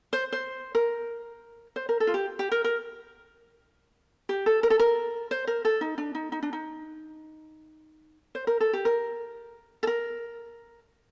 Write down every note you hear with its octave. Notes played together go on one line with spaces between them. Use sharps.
C5
C5
A#4
C5
A#4
A4
F4
G4
G4
A#4
A#4
G4
A4
A#4
A4
A#4
C5
A#4
A4
D#4
D4
D#4
D#4
D4
D#4
C5
A#4
A4
G4
A#4
A4
A#4